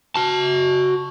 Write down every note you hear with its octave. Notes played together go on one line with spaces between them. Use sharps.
F#4 A5